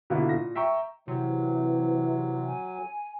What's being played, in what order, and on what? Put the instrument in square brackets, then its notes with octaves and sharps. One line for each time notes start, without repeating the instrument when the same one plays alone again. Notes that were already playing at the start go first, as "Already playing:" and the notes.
[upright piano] B2 D3 A#3 B3 E4 F4
A#2 A#6
E5 G5 A#5 C#6
[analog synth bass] C3 [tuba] E3 [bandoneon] F#3
[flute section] G#5